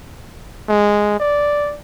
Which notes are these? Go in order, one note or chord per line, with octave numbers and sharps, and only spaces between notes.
G#3
D5